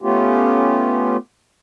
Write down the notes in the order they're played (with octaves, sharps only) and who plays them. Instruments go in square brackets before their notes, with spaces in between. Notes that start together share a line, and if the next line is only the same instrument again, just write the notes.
[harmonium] A3 B3 C#4 F4 G4